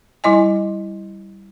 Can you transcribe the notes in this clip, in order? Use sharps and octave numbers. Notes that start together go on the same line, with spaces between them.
G3 E4 D#5 G#5